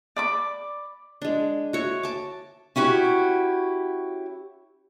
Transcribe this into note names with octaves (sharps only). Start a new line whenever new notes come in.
D5 B5 D6
G#3 D4
F#4 C#5 E5
A5 D6
C#4 E4 F#4 G4